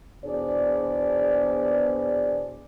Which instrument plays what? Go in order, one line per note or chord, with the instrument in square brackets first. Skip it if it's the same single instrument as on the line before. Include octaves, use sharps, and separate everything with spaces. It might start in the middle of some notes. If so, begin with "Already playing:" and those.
[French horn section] E2 B2 D4 G#4 C5 D5